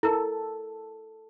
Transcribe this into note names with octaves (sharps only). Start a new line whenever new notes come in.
E4 A4 A#4